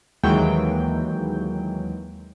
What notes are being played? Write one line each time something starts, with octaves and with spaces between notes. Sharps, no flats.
D#2 E3 F#3 G#3 G5